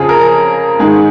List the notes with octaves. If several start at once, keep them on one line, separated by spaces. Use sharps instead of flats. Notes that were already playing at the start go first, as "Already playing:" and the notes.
Already playing: F2 C#3 F4 G#4
A#4
G#2 D#3 G#4